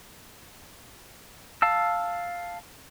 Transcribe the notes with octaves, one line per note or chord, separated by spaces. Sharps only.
F5 A5 E6